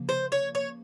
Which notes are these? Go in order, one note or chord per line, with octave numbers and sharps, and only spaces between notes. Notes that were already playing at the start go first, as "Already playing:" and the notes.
Already playing: C#3 F3 A#3
C5
C#5
C#5